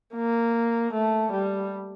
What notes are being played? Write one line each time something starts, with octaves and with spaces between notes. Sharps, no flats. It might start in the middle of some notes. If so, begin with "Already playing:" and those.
A#3
A3
G3